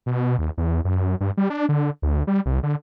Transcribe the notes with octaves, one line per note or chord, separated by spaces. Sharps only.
B2
D#2
E2
F#2
G2
G3
D4
D3
D2
G3
C2
D3